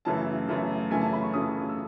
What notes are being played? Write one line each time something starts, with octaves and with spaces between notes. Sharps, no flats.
F#2 C#3 E3 A3 A5
F#2 C#3 E3 A3
F#2 C#3 E3 A3 G#5
A5
B5
C#6
F#2 C#3 E3 A3 D#6
E6